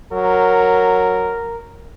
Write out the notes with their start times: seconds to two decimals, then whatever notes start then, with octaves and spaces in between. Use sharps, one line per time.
0.12 F#3 A#4